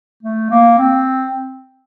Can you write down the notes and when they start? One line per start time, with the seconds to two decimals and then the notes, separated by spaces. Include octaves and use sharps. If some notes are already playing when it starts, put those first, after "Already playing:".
0.23 A3
0.50 A#3
0.78 C4